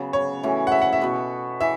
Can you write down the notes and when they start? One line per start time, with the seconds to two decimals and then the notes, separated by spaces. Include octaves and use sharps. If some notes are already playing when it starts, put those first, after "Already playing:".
Already playing: C#3 F#3 B3
0.13 C#5
0.43 A2 E3 C#4 F#4
0.67 F#5
0.72 E5
0.82 F#5
0.93 E5
1.01 B2 B3 F#4
1.61 E3 E5